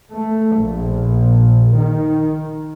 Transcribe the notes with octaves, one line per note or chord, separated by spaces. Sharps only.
A3
A#1
D#3